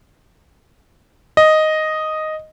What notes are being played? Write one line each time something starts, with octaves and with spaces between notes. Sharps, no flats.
D#5